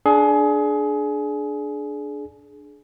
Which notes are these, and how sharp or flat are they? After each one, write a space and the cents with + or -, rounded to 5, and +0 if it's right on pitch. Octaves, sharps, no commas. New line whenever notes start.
D4 +0 G#4 +25